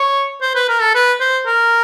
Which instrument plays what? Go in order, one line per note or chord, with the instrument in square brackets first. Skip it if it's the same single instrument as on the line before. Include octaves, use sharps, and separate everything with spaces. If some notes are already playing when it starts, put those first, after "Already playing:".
Already playing: [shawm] C#5
C5
B4
A#4
A4
B4
C5
A#4